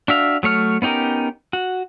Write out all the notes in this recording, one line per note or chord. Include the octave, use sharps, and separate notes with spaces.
D4 F#4 E5 F5
F#3 A3 C#5 F6
B3 C#4 D#4 G4 A#4
F#4